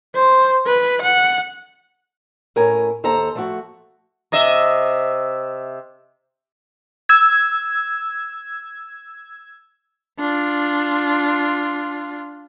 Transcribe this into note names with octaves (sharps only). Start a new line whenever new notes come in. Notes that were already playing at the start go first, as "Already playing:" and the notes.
C5
B4
F#5
A2 C#4 A#4 G#5
D#2 A4 C5 A#5
F3 A3 F#4
C3 D#5 E5
E6 G#6
D4 F4